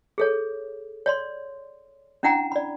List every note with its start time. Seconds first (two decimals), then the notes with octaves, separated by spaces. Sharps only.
0.18 G#4 A4 C#5
1.06 C#5 D5 C6
2.23 C#4 D4 E4 F#5 G5 A#5
2.52 D5 B5